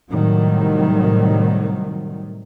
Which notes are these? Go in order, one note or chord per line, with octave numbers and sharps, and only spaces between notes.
A2 C3 D#3 F#3 G3